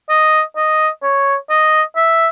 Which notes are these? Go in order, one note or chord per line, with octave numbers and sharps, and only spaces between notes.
D#5
D#5
C#5
D#5
E5